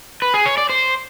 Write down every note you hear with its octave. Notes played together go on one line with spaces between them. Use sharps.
B4
G#4
C#5
D5
C5